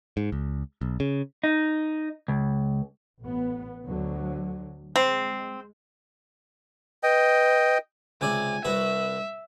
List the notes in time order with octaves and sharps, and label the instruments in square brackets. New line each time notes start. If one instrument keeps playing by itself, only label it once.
[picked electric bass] G#2
C#2
B1
C#3
[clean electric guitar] D#4
C#2
[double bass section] A1 B3
D2 D3 F#3
[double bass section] G#3 [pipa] C4
[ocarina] B4 [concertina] D#5 G5
[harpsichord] C#2 C3 D5 [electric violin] G#5
[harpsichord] C2 F#4 B4 [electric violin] E5